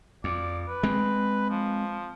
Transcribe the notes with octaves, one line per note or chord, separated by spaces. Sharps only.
F2 D5
B4
G#3 C4
F3